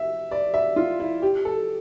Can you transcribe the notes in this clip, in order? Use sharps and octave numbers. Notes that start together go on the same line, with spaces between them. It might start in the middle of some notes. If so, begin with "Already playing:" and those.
Already playing: E5
D5
E5
F4
E4
G4
A4